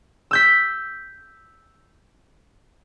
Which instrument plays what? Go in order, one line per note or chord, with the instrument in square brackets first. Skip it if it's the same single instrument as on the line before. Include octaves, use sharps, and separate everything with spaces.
[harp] E6 G6 B6